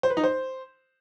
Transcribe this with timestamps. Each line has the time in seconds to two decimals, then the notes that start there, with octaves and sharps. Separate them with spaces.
0.03 C5
0.10 B4
0.17 D#4
0.24 C5